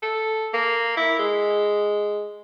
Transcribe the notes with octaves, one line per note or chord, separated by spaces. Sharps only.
A4
A#3
E4
G#3